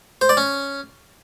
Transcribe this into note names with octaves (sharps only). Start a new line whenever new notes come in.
C5
D5
C#4